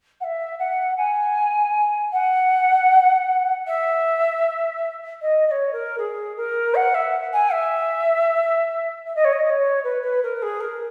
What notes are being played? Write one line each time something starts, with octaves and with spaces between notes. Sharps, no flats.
F#5
E5
F#5
G#5
F#5
E5
D#5
D#5
C#5
A#4
G#4
A#4
F#5
E5
G#5
E5
E5
D#5
C#5
D#5
D#5
C#5
B4
B4
A#4
G#4
A#4